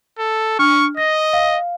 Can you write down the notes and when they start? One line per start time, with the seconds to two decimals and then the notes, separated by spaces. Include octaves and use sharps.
0.19 A4
0.59 D4 C#6 F6
0.97 D#5 A#6
1.33 F5